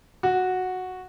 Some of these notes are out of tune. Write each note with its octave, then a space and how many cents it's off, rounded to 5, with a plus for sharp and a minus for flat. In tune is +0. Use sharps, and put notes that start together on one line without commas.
F#4 -5